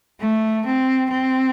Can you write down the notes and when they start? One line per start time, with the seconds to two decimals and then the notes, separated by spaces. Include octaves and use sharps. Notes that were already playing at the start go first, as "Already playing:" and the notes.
0.21 A3
0.66 C4
1.10 C4